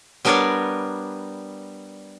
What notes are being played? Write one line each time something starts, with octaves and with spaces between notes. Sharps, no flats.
G3 B3 D4 A#4 C#5 D5